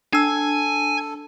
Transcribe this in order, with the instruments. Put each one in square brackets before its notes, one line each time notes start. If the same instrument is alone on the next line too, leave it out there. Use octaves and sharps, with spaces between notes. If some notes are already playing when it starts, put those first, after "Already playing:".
[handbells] D4 E6 [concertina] A4 [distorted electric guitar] G#5